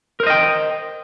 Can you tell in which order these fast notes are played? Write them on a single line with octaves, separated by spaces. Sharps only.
A#4 C5 D#5 G5